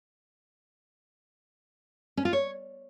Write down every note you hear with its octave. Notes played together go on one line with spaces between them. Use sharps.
C#4
F4
C#5